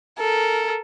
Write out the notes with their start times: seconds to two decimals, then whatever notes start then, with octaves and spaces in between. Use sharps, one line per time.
0.19 A4 A#4